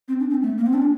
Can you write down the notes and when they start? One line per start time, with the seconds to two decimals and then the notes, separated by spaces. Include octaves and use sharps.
0.08 C4
0.19 D4
0.30 C4
0.42 A3
0.58 A#3
0.66 C4
0.74 D4